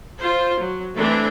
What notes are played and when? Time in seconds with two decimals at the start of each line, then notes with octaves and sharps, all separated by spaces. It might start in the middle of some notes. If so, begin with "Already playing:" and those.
0.18 F4 C5
0.60 F#3
0.96 E3 A3 C4 D4